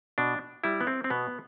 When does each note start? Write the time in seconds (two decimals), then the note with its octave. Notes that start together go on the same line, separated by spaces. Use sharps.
0.18 B2 D4
0.64 G3 E4
0.81 B3
0.87 C4
1.04 C4
1.10 B2 B3